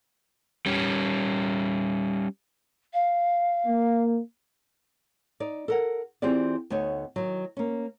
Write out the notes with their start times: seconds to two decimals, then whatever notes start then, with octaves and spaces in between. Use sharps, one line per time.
0.66 G3 C#4
2.93 F5
3.66 A#3
5.40 D#4 D5
5.68 A4 A#4 F#5
6.22 E3 C4 F4 G4 G#4 D5
6.70 D2 B3 D#4 C#5
7.16 D#3 F3 F#3
7.57 A#3 C#4